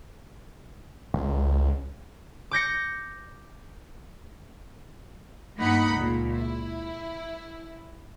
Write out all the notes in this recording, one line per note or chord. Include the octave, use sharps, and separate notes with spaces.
C#2
D6 G6 A#6 C#7
G2 A#3 D#4 F#5 B5 C#7
C#2 A#2
E4